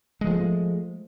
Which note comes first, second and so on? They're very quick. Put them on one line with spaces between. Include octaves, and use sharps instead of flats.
G#3 F#3 F3 A3